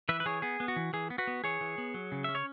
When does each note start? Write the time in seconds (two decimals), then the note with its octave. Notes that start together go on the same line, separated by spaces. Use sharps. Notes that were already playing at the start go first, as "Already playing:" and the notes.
0.09 E3 B4 E5
0.20 B4
0.26 E3 G#4 C#5
0.42 B3 G#4
0.60 B3
0.68 F#4
0.76 E3
0.93 E3 G#4
1.10 B3
1.18 F#4 B4
1.27 B3
1.44 E3 G#4 C#5
1.61 E3
1.78 B3
1.94 F#3
2.12 C#3
2.24 C#4 E5
2.35 C#5